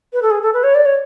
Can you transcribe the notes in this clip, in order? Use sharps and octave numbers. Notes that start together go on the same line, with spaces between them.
B4
A4
G#4
A4
B4
C#5
D5
C#5